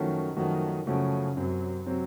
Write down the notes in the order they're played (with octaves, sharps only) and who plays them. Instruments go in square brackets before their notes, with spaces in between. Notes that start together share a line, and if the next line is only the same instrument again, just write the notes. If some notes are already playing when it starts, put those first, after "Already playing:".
Already playing: [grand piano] F#2 F3 A3 C#4 F#4 [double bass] D#3
[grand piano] F#2 F3 A3 C#4 F#4 [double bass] D#3
[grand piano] F#2 F3 A3 C#4 F#4 [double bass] C#3
[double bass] F#2 [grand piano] C3 F#3 C4
[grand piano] C3 F#3 C4